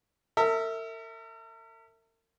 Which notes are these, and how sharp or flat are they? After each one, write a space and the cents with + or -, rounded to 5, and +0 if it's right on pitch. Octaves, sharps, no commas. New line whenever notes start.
A#4 -45 E5 -15